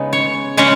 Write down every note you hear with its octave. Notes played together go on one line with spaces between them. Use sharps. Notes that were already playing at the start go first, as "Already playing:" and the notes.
Already playing: C#3 G#3 B3 D#4
C#5
C#3 G#3 C#4 C#5